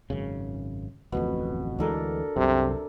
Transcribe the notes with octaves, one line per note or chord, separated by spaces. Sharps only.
G#1 F#2 C#3
D1 A1 F2 B2
D2 E3 G#3 D4 A4 A#4
C2 F#2 C3